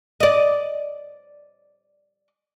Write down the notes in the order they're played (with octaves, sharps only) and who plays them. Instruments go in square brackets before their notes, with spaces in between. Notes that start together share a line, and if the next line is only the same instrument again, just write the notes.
[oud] D5 D#5